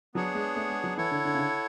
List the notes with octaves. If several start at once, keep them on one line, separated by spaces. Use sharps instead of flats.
F#3 B3 D4 G#4 C#5 F#5
G#3
A3
G#3
F#3
E3 E4 A4 C#5 F#5
D3
D3
C#3
D3